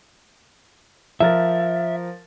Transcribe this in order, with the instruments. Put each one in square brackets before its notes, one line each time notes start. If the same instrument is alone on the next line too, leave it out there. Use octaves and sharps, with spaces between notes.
[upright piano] F3 A#4 A6 [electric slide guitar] E5